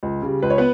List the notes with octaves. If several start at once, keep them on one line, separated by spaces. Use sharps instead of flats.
C#2
C#3 G3
C#2 B4
C#5
B3 B4